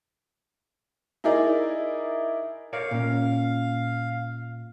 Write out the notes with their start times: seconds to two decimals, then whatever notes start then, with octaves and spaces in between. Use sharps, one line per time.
1.24 D#4 E4 G#4 A#4 D5
2.73 A#4 C#5 D5 F5
2.91 A#2 C#4